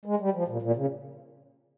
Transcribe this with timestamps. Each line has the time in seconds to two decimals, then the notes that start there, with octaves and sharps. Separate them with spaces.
0.05 G#3
0.20 G3
0.34 F3
0.48 A#2
0.62 A#2
0.76 C#3